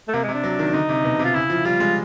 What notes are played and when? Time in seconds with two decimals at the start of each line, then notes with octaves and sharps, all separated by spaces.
0.08 A3
0.14 C3 A#3
0.24 C3 G#3
0.34 D4
0.44 F#3
0.59 D#3
0.74 D3 D#4
0.89 C3
1.04 B2
1.19 C3
1.24 F4
1.35 C#3 E4
1.50 F3
1.65 G3 F4
1.80 G#3